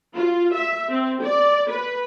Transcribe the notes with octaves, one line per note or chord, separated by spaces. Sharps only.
F4
E5
C4
D5
B4